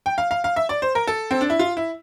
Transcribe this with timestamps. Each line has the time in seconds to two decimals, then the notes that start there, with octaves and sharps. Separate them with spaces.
0.06 G5
0.18 F5
0.31 F5
0.44 F5
0.56 E5
0.69 D5
0.82 C5
0.95 A#4
1.08 A4
1.31 C4
1.41 D4
1.50 E4
1.59 F4
1.77 E4